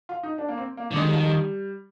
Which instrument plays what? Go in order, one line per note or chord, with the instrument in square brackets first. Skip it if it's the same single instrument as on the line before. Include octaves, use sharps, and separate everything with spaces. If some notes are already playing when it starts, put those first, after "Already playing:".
[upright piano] F4
D#4
D4
A#3
C4
A#3
[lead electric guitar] D3
[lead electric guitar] D#3 [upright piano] G#3
[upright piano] G3
F3
G3